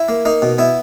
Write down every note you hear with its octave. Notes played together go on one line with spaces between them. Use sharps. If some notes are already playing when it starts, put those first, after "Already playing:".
Already playing: E4
A#3
A#3 D#4
B2
B3 E4